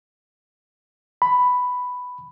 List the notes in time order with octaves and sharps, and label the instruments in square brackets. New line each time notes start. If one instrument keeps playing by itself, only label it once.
[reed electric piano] B5